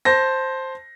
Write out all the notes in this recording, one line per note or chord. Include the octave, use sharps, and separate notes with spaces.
C5 A5 A#6